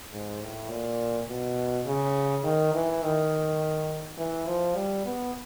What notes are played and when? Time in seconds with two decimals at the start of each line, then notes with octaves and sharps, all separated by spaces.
0.12 G#2
0.41 A2
0.70 A#2
1.29 B2
1.86 C#3
2.43 D#3
2.73 E3
3.03 D#3
4.17 E3
4.47 F3
4.75 G3
5.05 B3